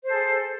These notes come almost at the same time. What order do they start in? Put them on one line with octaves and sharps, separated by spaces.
C5 A4 G#4